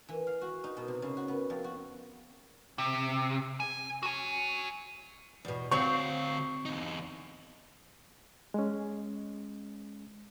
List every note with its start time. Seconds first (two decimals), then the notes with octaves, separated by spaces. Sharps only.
0.09 E3
0.27 F5
0.41 F#4
0.64 D#4
0.77 B2
0.88 C3
1.02 C#3
1.17 F#4
1.28 B3
1.50 F2
1.64 F#4
2.78 C3
3.60 G#5
4.03 F#4 G#5
5.45 E2 B2
5.71 D2 C4 F#4 C#5 F5 C#6
6.65 E2 D#4
8.54 G#3 C#4